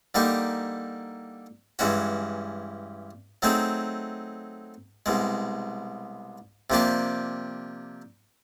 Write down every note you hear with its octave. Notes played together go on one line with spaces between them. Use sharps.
D3 G3 A#3 D#4 G4
G2 E3 G#3 C#4 F#4
F#3 A3 C4 D#4 G#4
C2 B2 G#3
C3 F3 A#3 D4 G4